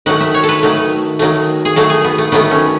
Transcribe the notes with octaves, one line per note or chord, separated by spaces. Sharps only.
D#3 F#3 A3 F#5
E5
C#5
A4
B4
D#3 F#3 A3
D#3 F#3 A3
G#4
D#3 F#3 A3 A4
G#4
B3
A3
D#3 F#3 A3 B3
C#4